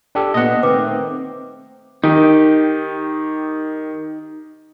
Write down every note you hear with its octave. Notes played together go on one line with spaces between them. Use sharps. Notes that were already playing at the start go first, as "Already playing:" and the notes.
D4 G4 A4
A#2 B3 D#5 F#5
D#3 A3 C4 B4 D6
D#3 D#4 G4